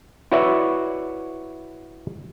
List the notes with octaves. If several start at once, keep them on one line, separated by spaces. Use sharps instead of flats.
E4 F#4 B4 C#5 D5 E5